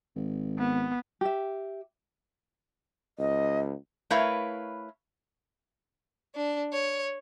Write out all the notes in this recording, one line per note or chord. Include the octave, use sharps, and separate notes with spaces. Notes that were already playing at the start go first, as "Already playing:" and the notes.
G#1
B3
G4 E5
C#2 D#5
A3 E4 A#4 B4 C#5 F5
D4
C#5